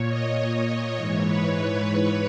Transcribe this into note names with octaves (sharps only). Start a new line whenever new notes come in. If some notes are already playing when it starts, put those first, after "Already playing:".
Already playing: A#2 C#5
D#5
C#5
C#5
G#2 E3 C#5
B4
B4